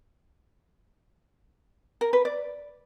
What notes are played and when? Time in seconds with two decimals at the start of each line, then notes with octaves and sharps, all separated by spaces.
2.01 A#4
2.13 B4
2.25 D5